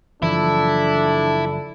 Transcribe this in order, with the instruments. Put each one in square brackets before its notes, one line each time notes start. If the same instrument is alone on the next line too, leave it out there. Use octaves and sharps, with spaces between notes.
[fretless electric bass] F#1 E3 F3 [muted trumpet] D4 [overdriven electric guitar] E4 [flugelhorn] A4